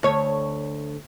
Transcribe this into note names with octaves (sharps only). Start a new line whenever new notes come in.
D2 C#5